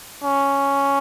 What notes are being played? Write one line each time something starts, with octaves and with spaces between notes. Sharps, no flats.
C#4